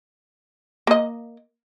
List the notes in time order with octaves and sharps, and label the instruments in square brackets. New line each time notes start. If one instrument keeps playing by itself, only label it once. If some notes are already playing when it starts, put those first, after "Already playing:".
[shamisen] A#3 D#5